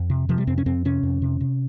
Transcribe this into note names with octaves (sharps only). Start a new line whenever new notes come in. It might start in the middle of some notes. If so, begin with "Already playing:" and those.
Already playing: F2
C3
C3 F3
G3
F2 C4
C#4
F2 C4
C3 C#4
F2
C3
C3